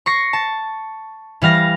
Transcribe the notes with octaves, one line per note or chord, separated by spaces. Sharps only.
C#6 A#6 C7
A5
E3 G3 F5 A#6